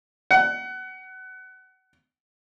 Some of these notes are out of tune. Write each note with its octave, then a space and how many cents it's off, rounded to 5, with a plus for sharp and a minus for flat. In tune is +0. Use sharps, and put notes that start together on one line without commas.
F#5 +25